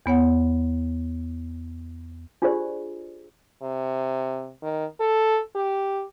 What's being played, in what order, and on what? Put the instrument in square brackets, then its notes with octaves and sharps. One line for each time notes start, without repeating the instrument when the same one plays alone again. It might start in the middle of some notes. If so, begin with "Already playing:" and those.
[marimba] E2 B3 C#5 F#5
[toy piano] D4 F4 G4 G#4 C5 D5
[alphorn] C3
D#3
A4
G4